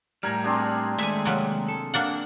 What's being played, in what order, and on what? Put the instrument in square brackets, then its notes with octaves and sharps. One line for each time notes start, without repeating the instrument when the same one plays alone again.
[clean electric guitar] A2 G3 [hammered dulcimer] A#4 G#5 A#5
[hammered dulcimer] C4 D4 G#4
[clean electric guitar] D#2 G#3 A3 [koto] E5 G#5
[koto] C3 F#3 A#3
[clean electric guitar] A4
[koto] A#3 D4 F#5